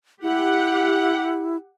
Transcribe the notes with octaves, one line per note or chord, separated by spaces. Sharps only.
E4 G4 F#5